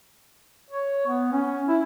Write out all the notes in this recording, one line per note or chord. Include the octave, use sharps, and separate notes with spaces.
C#5
B3
C#4
E4